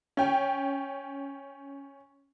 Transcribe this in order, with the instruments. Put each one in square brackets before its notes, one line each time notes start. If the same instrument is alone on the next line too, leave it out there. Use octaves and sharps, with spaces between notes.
[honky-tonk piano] C#4 G5